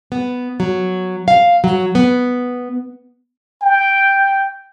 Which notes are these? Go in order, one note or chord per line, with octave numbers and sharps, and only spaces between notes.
B3
F#3
F5
F#3
B3
G5